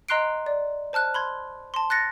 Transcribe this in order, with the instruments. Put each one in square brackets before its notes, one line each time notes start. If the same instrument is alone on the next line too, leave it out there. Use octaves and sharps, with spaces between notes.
[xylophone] D#5 A#5 C6 F#6 C7 D7
D5
C5 A5 F6 F#6
B5 C6 G#6
A5 C6
F#6 A6 A#6 C#7